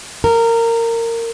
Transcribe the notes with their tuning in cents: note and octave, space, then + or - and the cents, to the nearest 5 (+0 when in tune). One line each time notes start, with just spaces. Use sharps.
A#4 -20